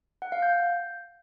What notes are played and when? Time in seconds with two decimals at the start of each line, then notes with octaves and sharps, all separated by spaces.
0.22 F#5
0.32 F5
0.42 G6